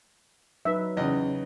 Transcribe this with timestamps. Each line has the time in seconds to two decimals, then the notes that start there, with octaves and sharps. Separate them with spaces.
0.65 F#3 D#4 B4 E5
0.97 E2 C#3 D#5